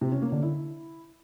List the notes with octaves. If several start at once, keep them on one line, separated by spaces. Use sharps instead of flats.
C3
C#4
A#3
D3
E4